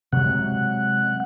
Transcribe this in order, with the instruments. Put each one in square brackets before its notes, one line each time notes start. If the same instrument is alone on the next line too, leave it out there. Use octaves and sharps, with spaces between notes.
[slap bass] C3 F#3 G#3 [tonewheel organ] F#5